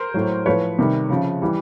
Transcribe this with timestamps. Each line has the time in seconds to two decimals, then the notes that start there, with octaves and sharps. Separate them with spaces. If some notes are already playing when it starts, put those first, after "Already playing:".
Already playing: A#4 C5
0.14 A2 F#3
0.46 A2 F3 B4 C#5
0.79 C3 D#3 G3
1.10 C#3 F3
1.42 E3 G3